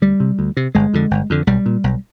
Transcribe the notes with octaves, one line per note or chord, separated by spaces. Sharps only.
D2 G3
C3
D2
C3
G1 G#3
F2 D3
G1
F2 D3
B1 G3
A#2
B1